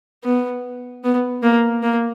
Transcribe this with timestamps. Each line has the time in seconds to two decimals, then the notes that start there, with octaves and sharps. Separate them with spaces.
0.24 B3
1.04 B3
1.43 A#3
1.83 A#3